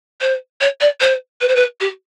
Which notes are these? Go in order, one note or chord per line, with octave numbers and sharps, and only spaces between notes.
C5
C#5
D5
C5
B4
C5
B4
G4